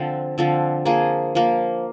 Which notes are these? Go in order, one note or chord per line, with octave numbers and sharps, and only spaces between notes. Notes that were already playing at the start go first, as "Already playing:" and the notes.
Already playing: D3 F3 C4
D3 F3 C4
F3 A#3 G#4
F3 A#3